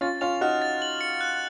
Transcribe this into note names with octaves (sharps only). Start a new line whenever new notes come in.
C#4 F4 A6
C#4 F4 F7
D#4 F#4 F6
A6
F#7
C#7
F#6